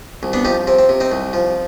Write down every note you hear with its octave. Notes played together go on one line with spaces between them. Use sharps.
C2
B3 D4
F3 D#4 G4
C3 C4
C4
C3
C4 D#4
C2
F3